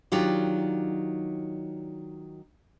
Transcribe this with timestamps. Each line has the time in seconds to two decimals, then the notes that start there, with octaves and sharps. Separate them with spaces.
0.12 D#3 F#3 D4 F4 G4